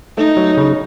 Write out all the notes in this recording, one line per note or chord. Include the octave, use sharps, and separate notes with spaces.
A3 D#4
F#3
C#3